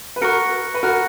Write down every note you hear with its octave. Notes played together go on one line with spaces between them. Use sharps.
B4
F#4 A#4 C#6 F#6 A#6 C#7
B4
F#4 A#4 C#6 F#6 A#6 C#7